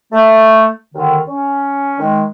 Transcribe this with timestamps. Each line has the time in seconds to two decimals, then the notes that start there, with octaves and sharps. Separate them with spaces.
0.12 A3
0.95 D#2 D3 D#3
1.27 C#4
1.99 D#3 G#3